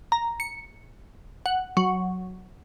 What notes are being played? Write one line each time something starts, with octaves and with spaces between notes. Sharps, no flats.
A#5
C#7
F#5
F#3